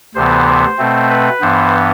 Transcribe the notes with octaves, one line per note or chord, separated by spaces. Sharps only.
D2 C3 E3 B3 C5
C5
B2 A3 C4
B4
G2 E3 B3 C5